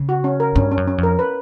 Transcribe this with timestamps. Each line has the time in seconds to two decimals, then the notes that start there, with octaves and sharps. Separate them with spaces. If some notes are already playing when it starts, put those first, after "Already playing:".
Already playing: C#3
0.09 F#4
0.24 C#4
0.40 A#4
0.56 G2 C#4
0.71 C#4
0.77 F#2
0.88 C#4
0.98 F2
1.03 A#4
1.19 B4